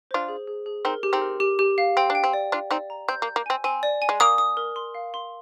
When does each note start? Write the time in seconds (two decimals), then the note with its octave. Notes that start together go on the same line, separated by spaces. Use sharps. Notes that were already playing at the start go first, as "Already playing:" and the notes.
0.11 D4 F4 C5
0.28 G#4
0.47 G#4
0.66 G#4
0.85 C4 D#4 A#4
1.03 G4
1.13 C4 D#4
1.22 A#4
1.40 G4
1.59 G4
1.78 F5
1.97 C4 G5
2.10 D4
2.15 G5
2.24 C4
2.33 D5
2.52 D4 F4 D5
2.70 C4 D#4 D5
2.90 A#5
3.08 C4 G6
3.22 A#3
3.27 G6
3.36 A#3
3.46 C4 G#5
3.64 C4 G#5
3.83 D5
4.02 G#5
4.09 G#3
4.20 A#3 D#6
4.38 D#6
4.57 A#4
4.76 C6
4.95 F5
5.14 C6